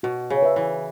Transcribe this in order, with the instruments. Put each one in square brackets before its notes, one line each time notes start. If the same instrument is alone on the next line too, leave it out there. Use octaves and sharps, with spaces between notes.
[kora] B2 [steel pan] F#4
[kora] C#3
[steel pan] B4 E5
[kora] E3